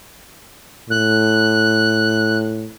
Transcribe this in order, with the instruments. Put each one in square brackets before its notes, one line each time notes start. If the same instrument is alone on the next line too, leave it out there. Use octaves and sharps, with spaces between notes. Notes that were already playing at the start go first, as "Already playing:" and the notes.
[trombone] A2 [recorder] F#6